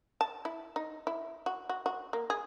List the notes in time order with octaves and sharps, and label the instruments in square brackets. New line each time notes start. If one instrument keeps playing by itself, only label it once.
[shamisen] A5
E4
D#4
E4
F#4
F#4
F#4
A#3
G#4